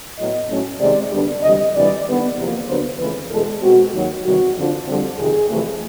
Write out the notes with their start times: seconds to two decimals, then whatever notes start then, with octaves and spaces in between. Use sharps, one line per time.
0.18 A2 F#3 B3 D#5
0.49 A2 F#3 A3 C#4
0.80 C3 D#3 G#3 D5
1.12 D2 D3 G3 B3 D4
1.43 D2 C3 E3 G3 D#5
1.74 D2 C3 E3 G3 D5
2.06 D#2 D3 G3 B3
2.38 E2 C3 F3 A#3
2.68 D2 D3 F#3 B3 C5
2.99 F2 C#3 E3 A3 B4
3.30 E2 B2 G#3 A4
3.62 B2 G#3 C4 F#4
3.94 D#2 D#3 F#3
4.24 E2 C3 D#3 G3 F#4
4.56 F2 D3 F3
4.87 F2 D3 G3 C4
5.18 F2 C3 D#3 G#4
5.50 F2 C3 E3 A3